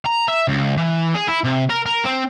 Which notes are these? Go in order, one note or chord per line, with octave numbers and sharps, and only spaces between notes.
A#5
E5
C#2
E3
G#4
E4
C3
A#4
A#4
C4